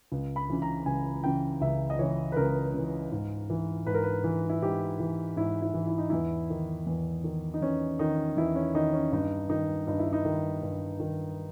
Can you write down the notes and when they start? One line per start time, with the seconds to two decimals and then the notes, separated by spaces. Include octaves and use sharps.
0.12 C#2
0.36 B5
0.49 C#3 E3
0.62 A#5
0.86 C#2 G#5
1.24 C#3 E3 G5
1.61 C#2 E5
1.90 D#5
1.99 C#3 E3 C#5
2.32 B4
2.36 C#2 A#4
2.74 C#3 E3
3.12 G#2
3.50 E3
3.86 G#2 B4
3.94 A#4
4.03 B4
4.24 E3
4.49 E4
4.62 G#2 G4
5.00 E3
5.36 G#2 E4
5.62 E4
5.74 E3
5.87 E4
5.98 D#4
6.10 E2 E4
6.50 D#3
6.86 E2
7.24 D#3
7.54 D#4
7.61 E2 C#4
7.99 D#3 D#4
8.37 E2 E4
8.56 C#4
8.74 D#3 D#4
8.93 C#4
9.12 G2 D#4
9.50 D#3 D#4
9.87 G2 D#4
9.99 E4
10.13 D#4
10.25 D#3
10.63 G2
11.00 D#3